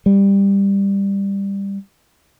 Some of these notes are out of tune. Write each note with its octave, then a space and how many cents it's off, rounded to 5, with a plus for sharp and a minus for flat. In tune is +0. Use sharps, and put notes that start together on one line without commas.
G3 +15